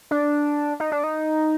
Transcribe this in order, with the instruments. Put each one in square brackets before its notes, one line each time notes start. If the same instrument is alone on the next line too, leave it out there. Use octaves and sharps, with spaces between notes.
[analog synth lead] D4
D#4
D4
D#4